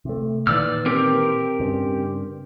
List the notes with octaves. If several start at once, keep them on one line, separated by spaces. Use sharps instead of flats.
C3 A3
A#2 D#3 E3 D5 E6 F6
C4 G4 A#4
G2 C#3